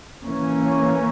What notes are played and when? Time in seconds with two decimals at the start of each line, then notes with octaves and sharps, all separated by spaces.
0.23 E3 A#3 C#4